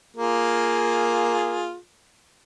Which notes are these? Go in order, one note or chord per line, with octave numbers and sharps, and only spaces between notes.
A#3 F4 G#4